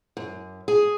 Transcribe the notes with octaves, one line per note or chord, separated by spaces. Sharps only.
F#2
G#4